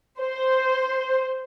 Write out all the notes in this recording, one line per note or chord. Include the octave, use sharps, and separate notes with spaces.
C5